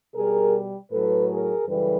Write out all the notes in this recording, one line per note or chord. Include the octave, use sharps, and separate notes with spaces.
B2 G3 G#4 A#4
A2 F#3 A4 B4
G#4 A#4
F#2 C#3 E3 G3 A4 B4